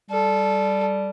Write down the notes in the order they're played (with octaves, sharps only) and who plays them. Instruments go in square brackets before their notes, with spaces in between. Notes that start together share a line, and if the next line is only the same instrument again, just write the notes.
[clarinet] G3 [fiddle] A4